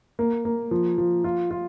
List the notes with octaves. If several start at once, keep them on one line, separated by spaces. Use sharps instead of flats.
A#3
A#3
F3
F3
F4
F4